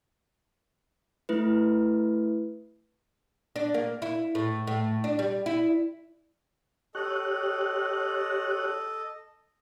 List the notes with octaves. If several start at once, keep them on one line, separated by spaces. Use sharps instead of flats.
A3 E4 B4
D4
A#3
E4
A2
A2
D4
G3
E4
G4 A4 C#5 D#5 F#6